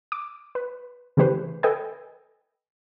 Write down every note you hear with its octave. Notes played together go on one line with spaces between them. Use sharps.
D6
B4
C#3 E3 A3 G4 B4 C5
A4 B4 D#5 G5 G#5